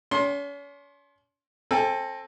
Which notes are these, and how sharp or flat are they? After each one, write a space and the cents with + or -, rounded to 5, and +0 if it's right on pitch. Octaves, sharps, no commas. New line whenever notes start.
C#4 +40 C6 +20
C4 +25 A4 +0 G#5 +0